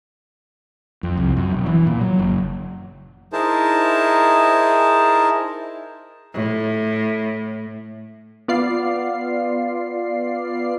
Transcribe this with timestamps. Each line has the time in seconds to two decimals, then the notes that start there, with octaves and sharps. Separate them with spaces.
1.03 F2
1.17 C2
1.37 F#2
1.52 E1
1.66 E3
1.87 A#2
2.01 F#3
2.19 F#1
3.33 D#4 E4 G#4 A#4 C5 A5
6.34 A2
8.48 B3 F4 D5 F5 C7